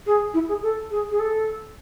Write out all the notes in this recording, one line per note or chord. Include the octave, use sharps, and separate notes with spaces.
G#4
E4
G#4
A4
G#4
G#4
A4